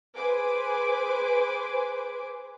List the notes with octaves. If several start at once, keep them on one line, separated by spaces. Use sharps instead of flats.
G#4 B4 C5 G#5 D6